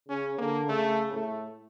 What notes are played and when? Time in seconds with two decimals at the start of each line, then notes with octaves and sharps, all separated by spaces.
0.09 C#3 C#4
0.38 D3 A#3
0.69 C#3 A3
1.13 A2 A3